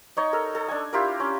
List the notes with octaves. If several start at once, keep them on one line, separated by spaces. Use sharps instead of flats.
D#4 C#5 D#5
A4 A#4
A4
D4 G#5
E4 F4 G4 A#4
C#4